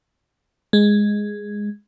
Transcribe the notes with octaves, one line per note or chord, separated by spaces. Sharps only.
G#3